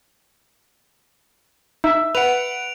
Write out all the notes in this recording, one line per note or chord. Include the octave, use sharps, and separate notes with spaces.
D#4 E5
B4 F#5 D7 F7